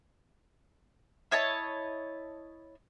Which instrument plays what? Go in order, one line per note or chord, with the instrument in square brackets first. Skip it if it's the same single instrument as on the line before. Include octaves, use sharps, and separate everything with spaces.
[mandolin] E4 C#5 D#5 A5